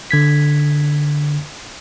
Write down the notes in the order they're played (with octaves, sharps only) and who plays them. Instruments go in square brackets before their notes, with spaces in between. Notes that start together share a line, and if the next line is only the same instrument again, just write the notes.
[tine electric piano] D3 G#6 B6